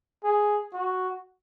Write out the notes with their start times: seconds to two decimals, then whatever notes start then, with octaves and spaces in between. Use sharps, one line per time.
0.24 G#4
0.73 F#4